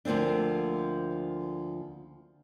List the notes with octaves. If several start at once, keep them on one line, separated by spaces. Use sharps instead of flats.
D2 F3 A#3 C4 D4